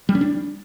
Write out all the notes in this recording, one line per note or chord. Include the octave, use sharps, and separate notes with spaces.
G3
C#4
D4